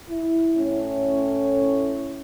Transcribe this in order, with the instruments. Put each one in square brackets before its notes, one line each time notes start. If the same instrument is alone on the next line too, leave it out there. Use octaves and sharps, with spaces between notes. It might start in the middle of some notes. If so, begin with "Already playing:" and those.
[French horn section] E4
A2 A3 C#4